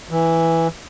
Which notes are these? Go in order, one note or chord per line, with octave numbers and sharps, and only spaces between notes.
E3